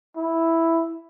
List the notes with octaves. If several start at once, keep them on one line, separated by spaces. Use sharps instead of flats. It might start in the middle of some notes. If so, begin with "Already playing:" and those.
E4